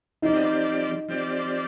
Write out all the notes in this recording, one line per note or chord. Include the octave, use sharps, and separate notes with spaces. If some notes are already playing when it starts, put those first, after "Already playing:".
F3 C4 D#4 G4 D5
F3 C4 G4 D5